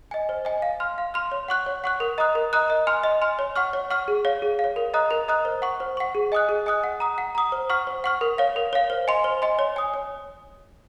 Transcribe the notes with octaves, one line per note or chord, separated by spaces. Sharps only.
D#5 G#5
C5
D#5 G#5
F5
C6 F6
F5
C6 F6
C#5
F#5 C#6 F#6
C#5
F#5 C#6 F#6
A#4
D#5 A#5 D#6 F#6
A#4
D#5 A#5 D#6 F#6
D#5
G#5 C6 F6
D#5
G#5 C6 F6
C#5
F#5 C#6 F6
C#5
F#5 C#6 F6
G#4
C#5 F5
G#4
F5
C#5
A#4
D#5 A#5 D#6 F#6
A#4
D#5 A#5 D#6 F#6
C5
F#5 C#6
C5
F#5 C#6
G#4
D#5 G#5 D#6 F#6
G#4
D#5 G#5 D#6 F#6
F#5
A#5 D#6
F#5
A#5 D#6
C5
F#5 C#6 F6
C5
F#5 C#6 F6
A#4
C#5 F5
A#4
C#5 F5
C5
D#5 G#5 C6
C5
D#5 G#5 C6
C#5
G#5 D#6
C#5